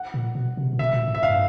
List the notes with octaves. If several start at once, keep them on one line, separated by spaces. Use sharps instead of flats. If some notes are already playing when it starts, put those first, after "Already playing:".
Already playing: F#5
A#2
B2
C3
A#2
B2 E5
A#2
A2
E5
G2 F5